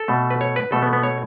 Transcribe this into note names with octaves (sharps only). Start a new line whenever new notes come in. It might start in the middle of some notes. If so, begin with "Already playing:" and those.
Already playing: A4
B2 A3
B4
C#5
B4
B2 A3 A4
B3
B3
C#5